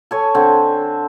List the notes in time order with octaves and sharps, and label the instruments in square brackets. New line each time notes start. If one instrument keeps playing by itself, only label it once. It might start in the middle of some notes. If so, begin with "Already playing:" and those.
[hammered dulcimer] A4 C#5 G#5
D3 C4